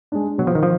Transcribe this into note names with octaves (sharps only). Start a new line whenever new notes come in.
G#3 D4
B2 F#3
F3
D#3
F3